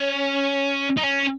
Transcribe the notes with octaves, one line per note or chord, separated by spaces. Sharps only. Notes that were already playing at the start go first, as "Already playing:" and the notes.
Already playing: C#4
D#4
C#4